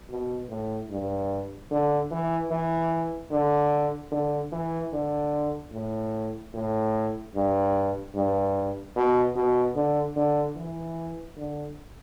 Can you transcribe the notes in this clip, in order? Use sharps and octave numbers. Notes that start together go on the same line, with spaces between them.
B2
A2
G2
D3
E3
E3
D3
D3
E3
D3
A2
A2
G2
G2
B2
B2
D3
D3
E3
D3